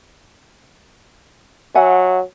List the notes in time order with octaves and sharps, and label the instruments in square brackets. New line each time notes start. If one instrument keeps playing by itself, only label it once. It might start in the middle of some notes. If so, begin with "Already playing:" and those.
[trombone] F#3 [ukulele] E5 F#5 G#5